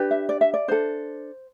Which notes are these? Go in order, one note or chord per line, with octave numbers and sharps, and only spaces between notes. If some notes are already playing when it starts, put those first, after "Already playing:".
Already playing: D4 G4 B4
E5
D5
E5
D5
D4 A4 C5